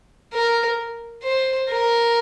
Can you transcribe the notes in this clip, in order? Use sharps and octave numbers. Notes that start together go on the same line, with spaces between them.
A#4
C5
A#4